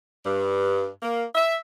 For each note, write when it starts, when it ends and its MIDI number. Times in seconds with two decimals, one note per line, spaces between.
0.24 0.87 43
1.02 1.23 58
1.33 1.56 76